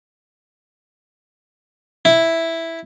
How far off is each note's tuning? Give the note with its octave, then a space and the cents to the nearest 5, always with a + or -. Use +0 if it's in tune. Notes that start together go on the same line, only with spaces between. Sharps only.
E4 +0